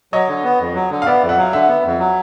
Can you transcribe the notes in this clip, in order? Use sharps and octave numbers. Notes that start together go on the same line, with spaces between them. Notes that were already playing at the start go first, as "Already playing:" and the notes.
F#3 C#5 D#5
D3
B3
F2
F#3
D3
F5
B3 D5 E5
F2
E5 F#5
F#3 F5
D3 E5 F#5
B3
F2
F#3